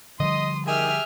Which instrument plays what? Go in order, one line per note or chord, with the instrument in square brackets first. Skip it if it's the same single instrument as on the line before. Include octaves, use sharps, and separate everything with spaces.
[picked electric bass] D3 F3 G3 [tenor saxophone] D#5 [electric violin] C6 D#6
[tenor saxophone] D#3 [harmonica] G4 G#4 G#5 [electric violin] E5 F6